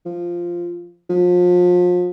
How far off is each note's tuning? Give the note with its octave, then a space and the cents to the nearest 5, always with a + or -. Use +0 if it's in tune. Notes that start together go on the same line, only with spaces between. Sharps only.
F3 -5
F3 +35